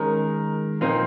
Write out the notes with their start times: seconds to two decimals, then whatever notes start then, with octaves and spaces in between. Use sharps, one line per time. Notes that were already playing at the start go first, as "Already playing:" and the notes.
Already playing: D#3 G#3 C#4 A#4
0.81 A#2 F3 A#3 C4 D#4